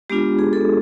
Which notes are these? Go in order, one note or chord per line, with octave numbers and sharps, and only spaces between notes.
G#3 B3 D4 F4 G4
G#4
A4